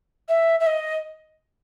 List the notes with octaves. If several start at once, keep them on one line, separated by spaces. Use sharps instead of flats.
E5
E5
D#5